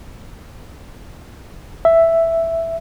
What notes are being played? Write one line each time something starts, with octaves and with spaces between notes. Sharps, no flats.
E5